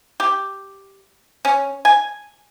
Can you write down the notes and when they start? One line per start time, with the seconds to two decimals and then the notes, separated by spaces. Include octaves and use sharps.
0.20 G4
1.45 C#4
1.85 G#5